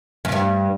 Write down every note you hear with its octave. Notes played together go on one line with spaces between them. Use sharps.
F#2
G2